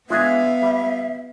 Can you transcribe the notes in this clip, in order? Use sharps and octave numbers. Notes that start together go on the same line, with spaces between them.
G#3 B3 D4 F4 G#4 E5 F5
G3